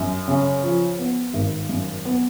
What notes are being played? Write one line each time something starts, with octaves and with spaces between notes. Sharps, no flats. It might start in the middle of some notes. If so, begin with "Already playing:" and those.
Already playing: F#2
C#3
F3
B3
G#1
F#2
B3